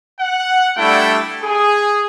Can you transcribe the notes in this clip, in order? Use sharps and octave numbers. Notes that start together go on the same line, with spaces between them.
F#5
G3 A3 D4 E4 G5
G#4